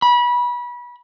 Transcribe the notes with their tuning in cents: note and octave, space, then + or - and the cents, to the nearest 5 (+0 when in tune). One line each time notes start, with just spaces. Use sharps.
B5 -25